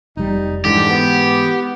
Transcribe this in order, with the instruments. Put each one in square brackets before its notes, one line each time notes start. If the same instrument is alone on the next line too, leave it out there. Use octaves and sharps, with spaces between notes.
[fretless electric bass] F1 G3 [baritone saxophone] D#4
[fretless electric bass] G#2 E3 [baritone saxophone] D3 [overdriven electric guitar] G4
[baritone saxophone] B3